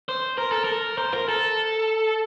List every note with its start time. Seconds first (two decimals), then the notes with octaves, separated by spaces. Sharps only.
0.09 C5
0.38 A#4
0.52 A4
0.64 A#4
0.98 C5
1.14 A#4
1.29 A4